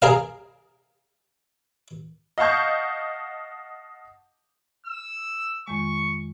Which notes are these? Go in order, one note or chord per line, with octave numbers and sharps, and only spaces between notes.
G#4 A#4 F5
D#5 F5 F#5 A5 C#6 G6
E6
F2 D#3 G#3 C#6